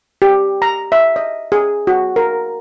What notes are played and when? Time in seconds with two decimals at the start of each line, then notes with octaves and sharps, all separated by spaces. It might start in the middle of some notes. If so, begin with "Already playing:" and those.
0.22 G4
0.62 A#5
0.92 E5
1.16 D#5
1.52 G#4
1.87 F#4
2.16 A#4